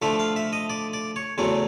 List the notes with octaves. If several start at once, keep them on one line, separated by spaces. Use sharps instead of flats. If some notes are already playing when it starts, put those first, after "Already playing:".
D3 F3 A3 E5
F5
E5
D#5
D5
D5
C#5
E2 C#3 F#3 A3 C4